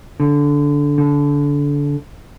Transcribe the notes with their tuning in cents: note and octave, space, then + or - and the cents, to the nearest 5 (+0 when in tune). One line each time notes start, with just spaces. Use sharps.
D3 -15
D3 -25